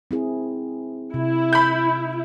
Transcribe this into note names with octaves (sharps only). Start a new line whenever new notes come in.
C4 E4 G#4
C3 E4
B5 G6